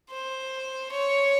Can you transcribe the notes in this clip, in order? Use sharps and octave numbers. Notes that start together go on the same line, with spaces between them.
C5
C#5